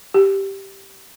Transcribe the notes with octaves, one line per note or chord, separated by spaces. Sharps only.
G4